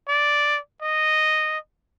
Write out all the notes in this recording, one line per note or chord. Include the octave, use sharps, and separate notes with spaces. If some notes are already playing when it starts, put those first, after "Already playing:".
D5
D#5